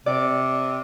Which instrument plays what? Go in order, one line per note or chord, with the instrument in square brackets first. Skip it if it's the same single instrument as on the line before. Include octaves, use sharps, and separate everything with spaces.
[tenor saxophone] C3 [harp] D5